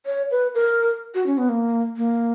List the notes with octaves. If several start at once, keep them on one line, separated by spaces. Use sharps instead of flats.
C#5
B4
A#4
F#4
C#4
B3
A#3
A#3